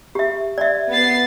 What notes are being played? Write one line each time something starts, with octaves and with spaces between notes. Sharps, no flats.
G4 E5
D5 E5
B3 A6 C7